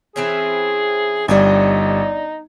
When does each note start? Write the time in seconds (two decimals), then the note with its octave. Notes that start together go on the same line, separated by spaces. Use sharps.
0.16 E3 C4 C#4 G#4
1.28 G1 G3 D4 D#4 D#5 G#5